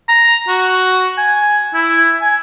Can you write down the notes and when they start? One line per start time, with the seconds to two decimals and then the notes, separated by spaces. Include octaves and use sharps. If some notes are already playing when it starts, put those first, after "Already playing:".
0.08 A#5
0.48 F#4
1.18 G#5
1.74 E4
2.21 G#5